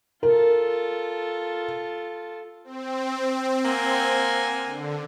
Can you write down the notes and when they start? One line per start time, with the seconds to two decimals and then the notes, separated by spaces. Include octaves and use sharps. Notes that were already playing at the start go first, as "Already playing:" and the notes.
0.23 F4 A4 A#4
2.64 C4
3.64 A#3 F#5 G#5
4.65 D3